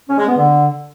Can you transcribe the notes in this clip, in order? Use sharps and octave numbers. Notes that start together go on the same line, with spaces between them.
C#4
G#3
B3
D3